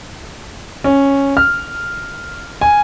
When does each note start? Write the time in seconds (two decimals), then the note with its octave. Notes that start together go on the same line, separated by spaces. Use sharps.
0.84 C#4
1.37 F6
2.61 G#5